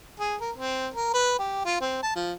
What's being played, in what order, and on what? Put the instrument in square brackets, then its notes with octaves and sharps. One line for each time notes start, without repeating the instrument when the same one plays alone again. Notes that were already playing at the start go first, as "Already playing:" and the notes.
[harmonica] G#4
A#4
C4
A#4
B4
G4
F4
C4
A5
F3